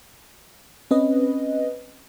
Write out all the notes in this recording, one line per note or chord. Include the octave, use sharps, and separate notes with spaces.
C4 C#4 B4 D#5